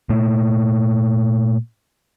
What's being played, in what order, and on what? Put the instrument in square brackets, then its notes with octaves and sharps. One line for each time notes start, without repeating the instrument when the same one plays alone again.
[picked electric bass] A#2 A3